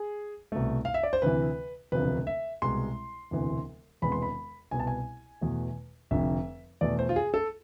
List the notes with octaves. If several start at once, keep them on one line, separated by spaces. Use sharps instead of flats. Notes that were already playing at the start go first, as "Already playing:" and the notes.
Already playing: G#4
C2 B2 A3
F5
E5
D5
C5
D2 C3 E3 B4
E1 D2 C3 F3 B4
E5
C2 B2 G#3 C6
E1 D2 C3 E3
E1 E2 C3 G#3 B3 B5
C6
B5
C2 B2 B3 G#5
A5
G#5
E2 B2 A3
F1 F2 D3 E5
E2 B2 A3 D5
C5
F4
G#4
A4